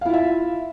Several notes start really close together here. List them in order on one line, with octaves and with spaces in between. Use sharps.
F5 E4 F4 E5